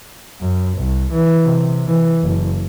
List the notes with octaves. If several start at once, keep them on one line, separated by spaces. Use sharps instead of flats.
F#2
C2
E3
C3
E3
F#1